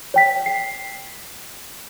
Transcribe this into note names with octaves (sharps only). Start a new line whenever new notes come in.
C#5 G5 B6
C7